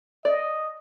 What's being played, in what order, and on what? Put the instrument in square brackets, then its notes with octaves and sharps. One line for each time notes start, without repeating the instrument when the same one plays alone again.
[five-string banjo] D5 [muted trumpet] D#5